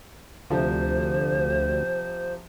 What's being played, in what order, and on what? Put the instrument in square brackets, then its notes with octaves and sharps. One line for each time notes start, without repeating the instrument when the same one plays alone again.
[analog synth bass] D2 [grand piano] C3 F3 [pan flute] C5